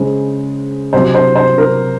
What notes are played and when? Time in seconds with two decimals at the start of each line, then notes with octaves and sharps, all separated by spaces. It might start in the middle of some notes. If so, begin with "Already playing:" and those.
Already playing: C#3 G#3 C5
0.93 C3 F#3 C5
1.15 C5
1.36 C5
1.58 A#4